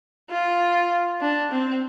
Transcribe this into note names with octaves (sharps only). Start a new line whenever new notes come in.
F4
D4
C4